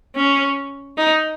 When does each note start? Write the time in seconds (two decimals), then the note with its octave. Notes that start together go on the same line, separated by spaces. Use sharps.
0.16 C#4
0.97 D#4